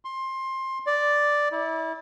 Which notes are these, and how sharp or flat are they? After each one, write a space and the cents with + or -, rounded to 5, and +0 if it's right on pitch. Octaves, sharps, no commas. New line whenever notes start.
C6 +20
D5 +0
E4 -30